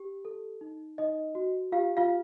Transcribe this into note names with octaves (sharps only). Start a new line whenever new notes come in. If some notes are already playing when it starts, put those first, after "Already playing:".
Already playing: G4
A4
D#4
D#4 D#5
F#4
F4 G4 F5
F4 F5